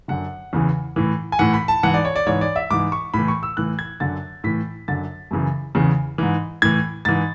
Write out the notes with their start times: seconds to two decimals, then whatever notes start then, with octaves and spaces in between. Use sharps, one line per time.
0.08 F#2 D3 F#5
0.53 E2 C#3 E3
0.96 A2 E3
1.32 G#5
1.39 A2 E3 F#5
1.54 B5
1.68 A5
1.83 G#2 E3 F#5
1.94 D5
2.05 C#5
2.16 D5
2.26 G#2 E3 C#5
2.41 D5
2.56 E5
2.70 G#2 E3 D6
2.92 C#6
3.14 A2 E3 B5
3.28 C#6
3.43 E6
3.57 A2 E3 F#6
3.79 G#6
4.00 F#2 D3 A6
4.44 A2 E3 B6
4.88 F#2 D3 A6
5.31 F#2 C#3 E3
5.75 E2 C#3 E3
6.18 G#2 E3
6.62 A2 E3 G#6
7.05 G#2 E3 A6